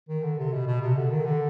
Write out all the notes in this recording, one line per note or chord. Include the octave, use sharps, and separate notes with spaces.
D#3
D3
C3
B2
B2
C3
D3
D#3
D3